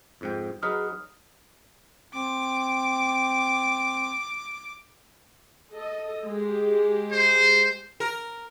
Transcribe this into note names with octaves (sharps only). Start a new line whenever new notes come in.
F2 G#2 G5
F#3 D#4 G#4 B4 F6
C4 D6
A4 D#5
G#3 G4
C5
A#4